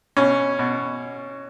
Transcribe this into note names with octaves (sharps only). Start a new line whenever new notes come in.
B2 C#4
B2